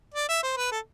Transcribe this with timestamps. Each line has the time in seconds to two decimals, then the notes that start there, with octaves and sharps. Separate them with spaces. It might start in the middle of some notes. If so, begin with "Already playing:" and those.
0.14 D5
0.29 E5
0.43 C5
0.57 B4
0.72 A4